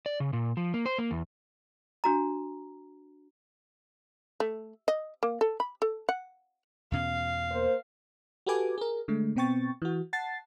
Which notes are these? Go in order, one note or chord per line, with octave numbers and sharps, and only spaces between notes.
D5
C#3
A#2
F3
A#3
C5
A#3
E2
D4 F#4 A#5
A3
D#5
A#3
A4
B5
A4
F#5
E2 B2 C#4 F5
A#3 A#4 C5
F#4 G4 A4 B4 G#5 D6
G#4 A#4
D3 G#3 A3
B2 B3 C4 G5 C#6 A6
E3 F#4
F#5 A5 A6 C7